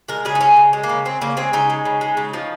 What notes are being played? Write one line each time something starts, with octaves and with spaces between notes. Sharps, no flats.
G#3 A#4
C#3 G#4
D#4
G#3 C#4
C#3
G#3
A#3
C#3
G#3 C4
C#3 A#3
G#3 C4
C#3 D#4
G#3
C#3
G#3
C#3
F3